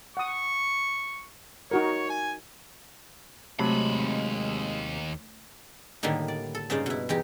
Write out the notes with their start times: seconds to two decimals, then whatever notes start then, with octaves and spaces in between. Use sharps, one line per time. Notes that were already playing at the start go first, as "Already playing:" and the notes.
0.17 F#5 C#6 D#6
1.71 D#4 F#4 A#4 C#5
2.10 G#5
3.59 D#2 C3 F#3 G#3 A3 B5
6.03 A2 D3 D#3 G3 A#3 D#4
6.28 D5
6.55 A4
6.70 G2 C#3 D#4 C5 D5 F5
6.86 B2 E4
7.09 E2 D#4 G4